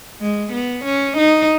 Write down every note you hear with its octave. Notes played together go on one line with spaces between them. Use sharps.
G#3
B3
C#4
D#4